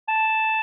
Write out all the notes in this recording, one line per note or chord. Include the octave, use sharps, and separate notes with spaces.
A5